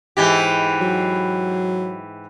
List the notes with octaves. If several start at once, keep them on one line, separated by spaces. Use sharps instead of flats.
G#2 E3 G4
F#3